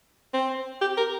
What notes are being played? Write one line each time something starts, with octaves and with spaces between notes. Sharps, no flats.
C4
G4
A#4